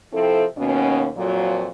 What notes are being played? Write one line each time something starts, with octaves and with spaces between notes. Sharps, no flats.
C3 F3 C4 E4 A4
D#2 B2 C#4
F2 A#2 F#3